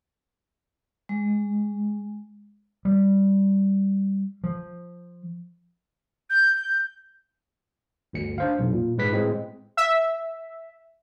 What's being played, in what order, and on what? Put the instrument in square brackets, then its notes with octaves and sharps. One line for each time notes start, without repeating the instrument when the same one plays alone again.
[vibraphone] G#3
[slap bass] G3
F3
[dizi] G6
[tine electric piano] G1 D2 C#7
D4 C5 F5
B1 F2
A#2
G#2 G#3 B4 B6
A2 G#3 C4
[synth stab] E5